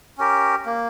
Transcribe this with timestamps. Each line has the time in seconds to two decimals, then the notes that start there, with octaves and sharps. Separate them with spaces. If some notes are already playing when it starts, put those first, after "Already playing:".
0.18 C#4 G4 A#4
0.65 A#3